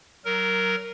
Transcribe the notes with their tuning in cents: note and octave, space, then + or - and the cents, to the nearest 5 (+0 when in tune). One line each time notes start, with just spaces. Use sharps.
F#3 +25 A#4 -5